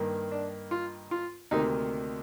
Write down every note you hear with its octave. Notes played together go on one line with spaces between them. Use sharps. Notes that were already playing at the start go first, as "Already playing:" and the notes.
Already playing: G2 D#3 A#3
D4
F4
F4
D2 C3 D#3 A#3 D#4